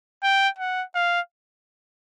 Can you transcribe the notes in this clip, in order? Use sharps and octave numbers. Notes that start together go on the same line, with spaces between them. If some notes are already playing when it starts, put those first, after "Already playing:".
G5
F#5
F5